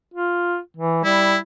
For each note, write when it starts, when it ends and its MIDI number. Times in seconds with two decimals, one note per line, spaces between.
0.14 0.58 65
0.77 1.03 52
1.04 1.36 55
1.04 1.37 64